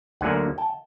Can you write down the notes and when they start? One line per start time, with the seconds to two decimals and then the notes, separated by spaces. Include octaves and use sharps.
0.21 D2 D3 F#3 A#3 F#5 G#5
0.58 G5 A5